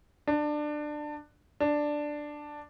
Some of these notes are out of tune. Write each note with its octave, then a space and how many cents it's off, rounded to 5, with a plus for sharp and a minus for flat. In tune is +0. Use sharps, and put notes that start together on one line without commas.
D4 +20
D4 +5